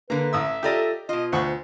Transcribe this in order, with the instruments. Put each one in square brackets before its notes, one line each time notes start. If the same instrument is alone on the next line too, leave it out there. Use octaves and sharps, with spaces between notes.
[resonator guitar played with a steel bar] D3 A#5 [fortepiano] A#3 [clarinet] B4
[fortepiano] A1 D#6 E6 [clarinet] E5
[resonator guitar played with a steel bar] F4 A4 D#5 [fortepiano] G4 D5 A#5
[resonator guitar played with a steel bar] B2 F4 [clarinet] D#5
[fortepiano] D2 F#5 C#6 [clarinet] C5